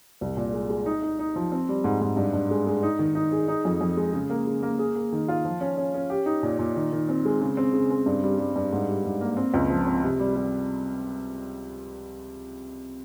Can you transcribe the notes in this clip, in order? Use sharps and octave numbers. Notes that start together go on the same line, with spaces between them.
C2
A#2
G#3
G#3
D#4
D#4
D#4
F3
C4
G3
G#2
G#2
G2
G2
G#3
G#3
D#4
D#3
D#4
G#4
D#4
F2
F2
G#3
C#3
A#3
C#3
A#3
G#4
A#3
D#3
F4
F3
C#4
C#4
C#4
G4
D#4
A#2
A#2
D#3
D#3
C4
G#3
C#3
C4
C#3
C4
G2
G3
G3
G2
G#2
G3
G#2
A#3
C4
C#2
F3
C4
C3
G3
G3